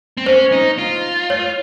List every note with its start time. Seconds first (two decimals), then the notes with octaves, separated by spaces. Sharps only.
0.17 C4
0.26 C#4 C5
0.52 D#4
0.79 F4
1.30 C#5